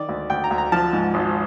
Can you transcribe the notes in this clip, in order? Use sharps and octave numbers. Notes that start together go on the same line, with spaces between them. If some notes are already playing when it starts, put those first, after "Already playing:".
Already playing: D#3 D5
D2
D2 G5
A#5
D2
A#5
F3 A5
G#2
G#1